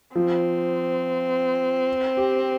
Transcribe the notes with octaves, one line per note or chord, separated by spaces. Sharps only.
F3 C4
G4